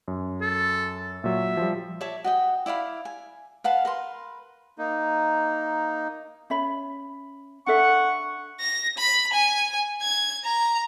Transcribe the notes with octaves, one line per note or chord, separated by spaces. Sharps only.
F#2
A4
A#2 F#3 E5
F3 G3
C#5 D5 E5 A5
F#4 D#5 G5
E4 D5 F5 B5
G#5
B4 F5 F#5 A5
A#4 B4 C6
A#3 D#4
C#4 E5 B5
D4 A4 E5 F#5 C#6
A#6
B5
G#5
G#6
A#5